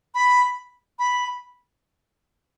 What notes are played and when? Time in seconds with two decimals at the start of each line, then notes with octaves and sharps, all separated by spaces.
0.15 B5
0.99 B5